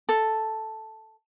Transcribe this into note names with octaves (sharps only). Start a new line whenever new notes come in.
A4